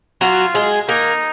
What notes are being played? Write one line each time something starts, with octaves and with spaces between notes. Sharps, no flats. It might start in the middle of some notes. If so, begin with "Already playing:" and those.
F#3 F4 F#4
G#3 G#4
A#3 D#4 A#4